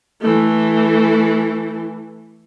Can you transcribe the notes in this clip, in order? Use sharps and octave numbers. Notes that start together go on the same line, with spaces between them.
E3 A3